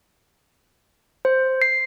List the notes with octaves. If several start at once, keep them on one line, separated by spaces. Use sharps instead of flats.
C5
C7